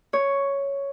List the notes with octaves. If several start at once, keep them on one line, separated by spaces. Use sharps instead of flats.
C#5